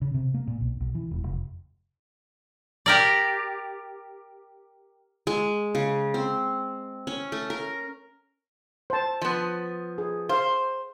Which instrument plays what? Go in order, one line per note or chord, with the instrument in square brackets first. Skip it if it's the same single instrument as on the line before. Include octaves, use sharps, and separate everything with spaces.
[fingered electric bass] C#3
C3
A#3
A#2
B1
B1
E3
E1
F1
[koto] G4 A#4 D5
[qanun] G#3
C#3
C4
C#4
A3
A#4
[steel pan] C5 A5
[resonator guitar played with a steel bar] F3 B3
[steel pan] G#4
[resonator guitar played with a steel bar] C5 [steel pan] F5